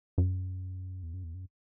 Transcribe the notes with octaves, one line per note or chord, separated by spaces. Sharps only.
F#2
E2
F#2
E2
F#2